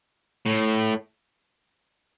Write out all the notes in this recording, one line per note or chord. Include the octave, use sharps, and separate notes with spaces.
A2